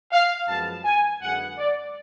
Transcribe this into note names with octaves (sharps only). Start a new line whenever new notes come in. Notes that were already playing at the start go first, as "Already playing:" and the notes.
F5
F#2 F3 G#3 B3 A5
G#5
F#2 D3 G#3 B3 F#5
D5